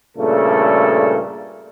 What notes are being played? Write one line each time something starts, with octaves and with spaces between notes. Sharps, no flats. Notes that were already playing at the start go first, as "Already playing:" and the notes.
G2 A#2 C#3 A3 A4